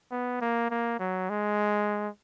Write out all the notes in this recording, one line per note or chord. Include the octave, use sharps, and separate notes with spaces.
B3
A#3
A#3
F#3
G#3